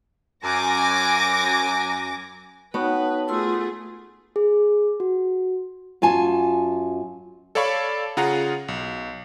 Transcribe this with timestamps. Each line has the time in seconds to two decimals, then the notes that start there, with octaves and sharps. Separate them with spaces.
0.44 F#2 G#5 D6 A#6
2.74 B3 D#4 F#4 B4 C#5 G5 A5
3.28 A3 F4 G#4 C6 E6
4.36 G#4
5.00 F#4
6.02 F#2 F4 G#5 A5
7.55 A4 C#5 D5 F5 B5 C#6
8.17 C#3 F4 G#4 F#5 A#5
8.68 B1